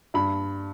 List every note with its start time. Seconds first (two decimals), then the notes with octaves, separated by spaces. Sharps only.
0.14 G2 B5